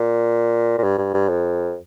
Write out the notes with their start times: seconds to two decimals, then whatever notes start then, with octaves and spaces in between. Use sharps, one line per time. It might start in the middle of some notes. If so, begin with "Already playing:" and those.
Already playing: A#2
0.78 A#2
0.83 G2
0.98 G2
1.14 G2
1.29 F2